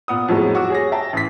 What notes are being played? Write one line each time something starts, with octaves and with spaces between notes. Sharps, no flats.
A#2 B3 D#6
F2 A2 F3 F#3 G#3 B3
F#4 C#6 D6 E6
G#4 C#5 A#6
E5 G5 A5 A#5
A1 B6